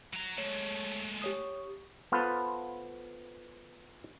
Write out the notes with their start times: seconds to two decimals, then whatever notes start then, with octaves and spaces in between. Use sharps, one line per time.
0.13 F#3 A#5
0.38 G#3 A3 C#5
1.22 G4 C#5 D#6
2.12 B3 F4 A4 B4 C5